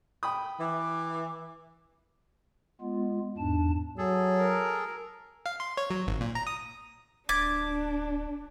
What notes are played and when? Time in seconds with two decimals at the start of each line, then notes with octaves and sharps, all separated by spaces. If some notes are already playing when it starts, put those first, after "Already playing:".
0.23 G5 B5 D#6
0.60 E3 D6
2.81 G#3 B3 F4
3.38 E2 G#2 D4 A5
3.98 F#3 G#4 A4
4.40 A#4
5.46 F5
5.60 C6
5.77 C#5
5.90 F#3
6.07 G#1
6.21 A#2
6.35 A#5
6.47 D#6
7.29 D1 D4 D6 G#6 A6 B6